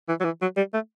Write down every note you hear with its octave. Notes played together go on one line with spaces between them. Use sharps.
E3
F#3
E3
F#3
G3
A3